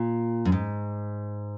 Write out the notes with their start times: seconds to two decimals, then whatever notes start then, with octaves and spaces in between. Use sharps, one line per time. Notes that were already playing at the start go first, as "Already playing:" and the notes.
Already playing: A#2
0.45 F#2
0.52 G#2